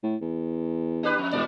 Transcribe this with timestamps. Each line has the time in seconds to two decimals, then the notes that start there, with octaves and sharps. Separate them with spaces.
0.03 A2
0.22 E2
1.03 D4 G4 B4
1.18 F2
1.32 E1 G#2 B2 D5